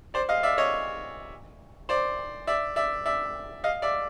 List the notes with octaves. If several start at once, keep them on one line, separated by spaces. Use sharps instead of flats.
C5 D5
D#5 F5
D5 E5
C#5 D#5
C5 D5
D5 E5
D5 E5
D5 E5
D#5 F5
D5 E5